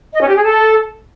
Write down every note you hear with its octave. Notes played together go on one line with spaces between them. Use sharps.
D#5
C#4
G4
G#4
A4